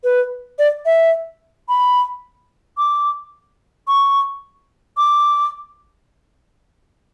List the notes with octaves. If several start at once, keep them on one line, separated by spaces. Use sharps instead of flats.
B4
D5
E5
B5
D6
C#6
D6